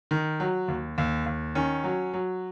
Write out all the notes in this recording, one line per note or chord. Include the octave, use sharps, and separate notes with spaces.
D#3
F#3
D#2
D#2
D#2
D#3 C#4
F#3
F#3